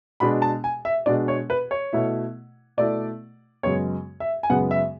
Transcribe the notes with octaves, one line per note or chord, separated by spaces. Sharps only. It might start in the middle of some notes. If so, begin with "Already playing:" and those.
B2 G#3 D4 B5
A5
G#5
E5
B2 G#3 D4 D5
C#5
B4
C#5
B2 A3 E4
B2 A3 E4 D5
F#2 C#3 G#3 B3 C#5
E5
G#5
F#2 C#3 G#3 B3 F#5
E5